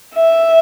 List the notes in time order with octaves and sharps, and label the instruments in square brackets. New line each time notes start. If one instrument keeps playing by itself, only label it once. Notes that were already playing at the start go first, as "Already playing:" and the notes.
[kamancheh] E5